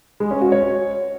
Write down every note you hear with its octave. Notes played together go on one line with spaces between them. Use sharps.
G#3
C#4
F#4
C#5